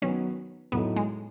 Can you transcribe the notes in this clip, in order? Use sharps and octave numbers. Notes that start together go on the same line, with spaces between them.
D#3 F#3 B3 C#4 D#4
A2 F#3 A3 B3 D#4
G#3